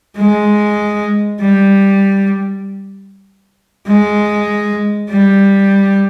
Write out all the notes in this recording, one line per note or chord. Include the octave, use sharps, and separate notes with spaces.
G#3
G3
G#3
G3